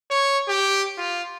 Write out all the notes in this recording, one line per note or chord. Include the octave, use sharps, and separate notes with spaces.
C#5
G4
F4